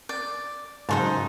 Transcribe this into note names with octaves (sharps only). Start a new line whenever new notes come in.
D5
G#2 C#3 F#3 D#4 C5 A5